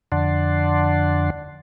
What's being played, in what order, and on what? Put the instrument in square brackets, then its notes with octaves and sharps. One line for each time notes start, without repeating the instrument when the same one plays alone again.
[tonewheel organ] F2 D3 D5 F#5 A5 C6